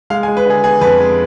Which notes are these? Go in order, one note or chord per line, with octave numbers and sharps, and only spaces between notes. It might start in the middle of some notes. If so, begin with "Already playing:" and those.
G#3 F5
G#5
G#3
B4
D3 G#4
B3 G#4
F2 B4
G#3